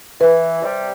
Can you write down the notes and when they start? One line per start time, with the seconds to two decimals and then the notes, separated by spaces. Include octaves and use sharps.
0.21 E3 B4
0.62 C3 G3